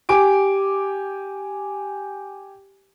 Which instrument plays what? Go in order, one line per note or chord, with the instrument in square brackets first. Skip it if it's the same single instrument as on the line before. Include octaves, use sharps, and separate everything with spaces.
[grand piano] G4 G#5 D6 D7